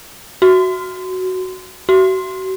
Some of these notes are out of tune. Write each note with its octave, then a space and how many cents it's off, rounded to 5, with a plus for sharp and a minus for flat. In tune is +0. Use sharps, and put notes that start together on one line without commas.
F#4 +5
F#4 +35